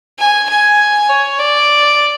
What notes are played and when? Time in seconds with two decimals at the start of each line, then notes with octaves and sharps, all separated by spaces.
0.19 G#5
0.49 G#5
1.09 C#5
1.39 D5